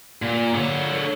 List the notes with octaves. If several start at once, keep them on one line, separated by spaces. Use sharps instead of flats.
A#2
D3 C#5